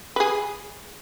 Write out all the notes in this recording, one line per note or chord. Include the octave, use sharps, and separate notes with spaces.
G#4 B4